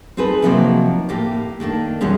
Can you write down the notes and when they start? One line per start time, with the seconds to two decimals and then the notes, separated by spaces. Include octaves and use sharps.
0.17 C4 D#4 G#4 A4 B4
0.42 C3 D#3 F3 F#3 A#3 C4
1.09 A2 A#3 G4
1.60 D#3 A3 A#3 D4
2.01 E2 B2 G3 G#3 C#4